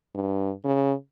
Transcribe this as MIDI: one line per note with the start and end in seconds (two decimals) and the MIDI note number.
0.15 0.51 43
0.64 0.93 49